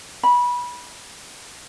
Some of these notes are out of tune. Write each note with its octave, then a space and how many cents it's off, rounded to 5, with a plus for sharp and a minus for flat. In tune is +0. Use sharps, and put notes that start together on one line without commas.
B5 -20